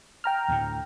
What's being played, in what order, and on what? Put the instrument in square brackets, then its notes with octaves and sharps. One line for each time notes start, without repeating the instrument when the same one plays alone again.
[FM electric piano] G5 A#5 F6
[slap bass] D2 A2